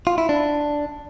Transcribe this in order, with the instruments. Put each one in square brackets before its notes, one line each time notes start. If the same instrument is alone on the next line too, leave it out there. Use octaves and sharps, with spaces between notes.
[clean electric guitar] F4
E4
D4